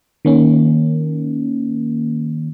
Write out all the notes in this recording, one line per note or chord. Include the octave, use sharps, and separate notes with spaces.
D#3 A#3 C#4